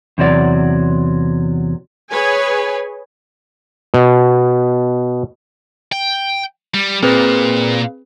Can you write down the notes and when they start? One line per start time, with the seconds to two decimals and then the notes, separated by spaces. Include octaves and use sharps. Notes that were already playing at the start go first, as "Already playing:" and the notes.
0.18 E2 C3 F#3 D5
2.11 G#4 B4 C#5 G#5
3.94 B2
5.92 G5
6.74 G3
7.03 A#2 A#3 C4 G#4 B4